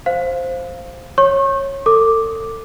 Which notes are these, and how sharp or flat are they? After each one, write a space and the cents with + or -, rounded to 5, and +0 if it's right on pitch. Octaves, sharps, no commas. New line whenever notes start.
C5 +0 F5 +0
C#5 -15 C#6 -35
A4 +35 D6 +5